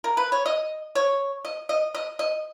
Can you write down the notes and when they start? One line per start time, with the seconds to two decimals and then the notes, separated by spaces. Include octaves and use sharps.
0.04 A#4
0.17 B4
0.32 C#5
0.46 D#5
0.95 C#5
1.45 D#5
1.69 D#5
1.95 D#5
2.19 D#5